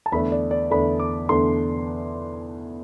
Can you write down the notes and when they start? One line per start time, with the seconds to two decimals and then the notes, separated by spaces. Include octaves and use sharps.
0.06 A5
0.12 E2 D3 A3 D4 B5
0.32 D5
0.51 D5
0.71 E2 D3 A3 D4 B5
1.00 D6
1.29 E2 D3 A3 D4 C6